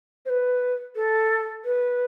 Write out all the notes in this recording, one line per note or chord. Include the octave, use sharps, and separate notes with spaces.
C5
B4
A4
B4